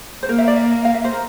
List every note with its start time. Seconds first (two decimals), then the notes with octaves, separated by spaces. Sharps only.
0.23 C5
0.28 A#3 A#4
0.38 E5
0.48 D5
0.57 E5
0.85 F5
0.94 E5
1.05 C5
1.13 A#4